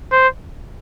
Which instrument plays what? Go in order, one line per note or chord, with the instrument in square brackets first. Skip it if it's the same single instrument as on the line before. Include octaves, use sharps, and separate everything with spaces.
[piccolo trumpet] C5